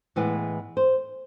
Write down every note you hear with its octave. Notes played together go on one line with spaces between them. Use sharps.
A2 E3 G#3 B3 B4
C5